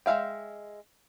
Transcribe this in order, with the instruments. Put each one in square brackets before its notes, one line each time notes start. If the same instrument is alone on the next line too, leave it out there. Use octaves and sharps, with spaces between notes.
[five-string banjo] G#3 E5 F5 G5